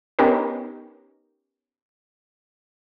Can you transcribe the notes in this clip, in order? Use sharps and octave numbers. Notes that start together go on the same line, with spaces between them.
B3 C#4 D#4 G4 A#4